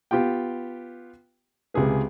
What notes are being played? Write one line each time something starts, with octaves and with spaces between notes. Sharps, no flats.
B3 F4 G4 G5
C#2 C3 G#4 B4